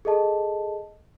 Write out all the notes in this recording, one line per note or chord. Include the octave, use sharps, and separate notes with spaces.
G#4 A4 D#5 A5